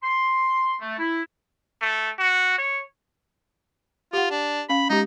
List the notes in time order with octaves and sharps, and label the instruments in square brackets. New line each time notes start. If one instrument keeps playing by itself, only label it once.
[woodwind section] C6
A3
E4
[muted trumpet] A3
F#4
C#5
[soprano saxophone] F4 [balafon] G4 F#5
[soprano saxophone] D4
[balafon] C#4 F5 [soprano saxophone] B5
[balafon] G#3 G4 [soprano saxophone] D#4